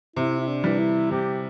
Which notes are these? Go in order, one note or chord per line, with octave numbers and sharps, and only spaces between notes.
C3 E4
E4
D4
E3 G3
E4
C3 G4